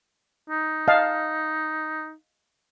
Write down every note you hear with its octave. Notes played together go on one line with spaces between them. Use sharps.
D#4
D#5 F5 A5